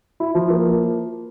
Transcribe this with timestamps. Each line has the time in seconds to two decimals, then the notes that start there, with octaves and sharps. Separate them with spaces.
0.20 E4
0.35 F3
0.50 A#3